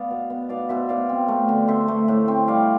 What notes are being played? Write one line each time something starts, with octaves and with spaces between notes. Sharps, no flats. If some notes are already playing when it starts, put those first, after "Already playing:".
Already playing: B3 D5 F5
B2
B3
B2 D5 F5
B2 C5 E5
B2 D5 F5
C4
A3
D3
D3 C5 E5
A3
A2
C4
G3 D5 F5